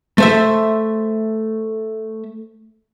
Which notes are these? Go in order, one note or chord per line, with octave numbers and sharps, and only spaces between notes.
A3 C5 E5